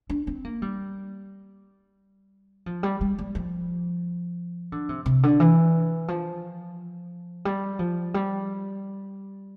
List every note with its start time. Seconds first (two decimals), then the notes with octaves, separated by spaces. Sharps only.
0.10 D4
0.27 C4
0.45 A#3
0.62 G3
2.66 F3
2.83 G3
3.01 G3
3.18 G3
3.35 F3
4.72 D3
4.89 C3
5.06 C3
5.23 D3
5.40 E3
6.08 F3
7.45 G3
7.79 F3
8.14 G3